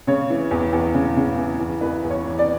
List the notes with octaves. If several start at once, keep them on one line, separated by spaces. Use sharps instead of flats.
C#3 C#5
E3
E2
E2
C#3
C#3
E3
E2
E3 B4
E2
C#5
E3
D5